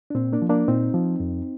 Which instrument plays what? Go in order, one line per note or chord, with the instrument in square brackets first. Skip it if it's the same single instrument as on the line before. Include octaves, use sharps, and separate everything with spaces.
[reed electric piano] D4
A#2 C4
A#3 D4
F3
A#3 D4
A#2 C4 D#4
F3
F2